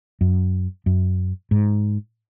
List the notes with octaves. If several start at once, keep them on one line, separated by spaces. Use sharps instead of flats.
F#2
F#2
G#2